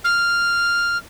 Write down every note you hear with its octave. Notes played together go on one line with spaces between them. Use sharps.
F6